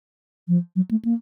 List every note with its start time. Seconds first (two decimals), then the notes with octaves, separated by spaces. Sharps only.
0.48 F3
0.76 F#3
0.91 A3
1.05 A#3